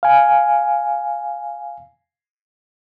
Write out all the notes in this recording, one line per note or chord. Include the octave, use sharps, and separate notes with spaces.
F5 G#5